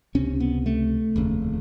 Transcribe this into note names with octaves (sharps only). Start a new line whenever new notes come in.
C#2 C3 C#4
B3
A3
F1 D#2 C#3